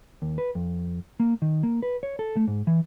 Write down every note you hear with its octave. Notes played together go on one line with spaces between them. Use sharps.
D#2
B4
F2
A#3
D#3
A#3
B4
C#5
A4
A3
G#2
E3